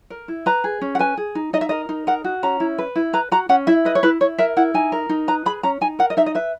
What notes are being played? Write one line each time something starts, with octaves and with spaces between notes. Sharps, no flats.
A#4
E4
B4 A#5
G#4
C#4
F#5
B4 G#5
G#4
D#4
D#4 D#5
E5
A#4 D#5
D#4
A#4 F#5
F#4
C#4 A#5
E4
B4
E4
B4 A#5
F#4 A#5
C#4 F#5
E4 E5
B4 D#5
C#5
E4 B4
E4 C#5
A#4 E5
E4 F#5
D#4 G#5
A#4
D#4
B4 A#5
G#4 B5
C#4 A#5
D#4 G#5
A#4 F#5
D#5
D#4 E5
D#5
B4 E5